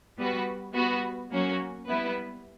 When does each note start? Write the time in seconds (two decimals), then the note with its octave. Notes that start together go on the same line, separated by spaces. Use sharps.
0.17 G3 B3 F#4 B4
0.74 G3 B3 F#4 B4
1.31 F#3 A#3 C#4 F#4
1.88 G3 B3 E4 B4